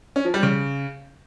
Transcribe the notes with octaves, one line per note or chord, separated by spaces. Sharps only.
C#4
F3
G3
C#3